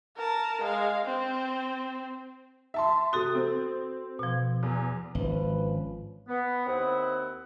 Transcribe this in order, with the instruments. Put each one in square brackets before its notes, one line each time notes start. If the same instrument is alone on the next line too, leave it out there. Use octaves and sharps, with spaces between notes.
[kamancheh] A#4 A5
G#3 F5
C4
[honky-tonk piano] E5 A5 C6
[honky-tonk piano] C3 D#6 [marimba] F#4 A4
[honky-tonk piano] C4
[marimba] B2 F3
[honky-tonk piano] E2
[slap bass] G#1 [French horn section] F3 C#4 B4
[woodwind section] B3
D#2 C4 E4 D#5 F#5